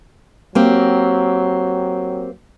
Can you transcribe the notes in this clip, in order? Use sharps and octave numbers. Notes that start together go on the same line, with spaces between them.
F#3 A#3 C4 G4